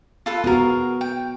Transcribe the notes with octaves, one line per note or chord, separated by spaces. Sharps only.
F4 A4 B4
B3 F#4 G#4 A#4
G5